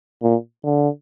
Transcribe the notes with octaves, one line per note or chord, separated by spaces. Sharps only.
A#2
D3